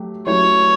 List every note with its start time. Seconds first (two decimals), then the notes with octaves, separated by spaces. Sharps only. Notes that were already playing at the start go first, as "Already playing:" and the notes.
Already playing: F#3 A3 G4
0.26 F#3 A3 C#4 E4 G4 C#5